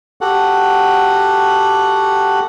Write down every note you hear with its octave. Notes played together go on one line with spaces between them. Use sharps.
F#4 G4 A4 F#5